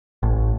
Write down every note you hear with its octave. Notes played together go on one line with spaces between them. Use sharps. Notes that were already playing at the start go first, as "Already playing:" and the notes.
A1